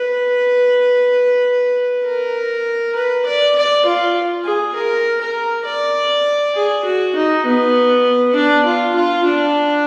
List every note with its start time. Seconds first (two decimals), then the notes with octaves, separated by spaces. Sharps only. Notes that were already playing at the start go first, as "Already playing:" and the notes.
Already playing: B4
2.04 A#4
2.95 B4
3.26 D5
3.56 D5
3.86 F4
4.45 G#4
4.75 A#4
5.21 A#4
5.65 D5
6.55 G#4
6.85 F#4
7.16 D#4
7.46 B3
8.35 D4
8.65 F4
8.95 F4
9.26 D4